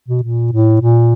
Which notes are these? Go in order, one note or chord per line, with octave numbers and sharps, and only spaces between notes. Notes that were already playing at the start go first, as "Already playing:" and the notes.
B2
A#2
A2
A#2